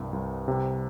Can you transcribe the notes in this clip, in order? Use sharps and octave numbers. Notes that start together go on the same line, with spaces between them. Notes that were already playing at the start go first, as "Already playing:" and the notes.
Already playing: C2 G2
C2
C3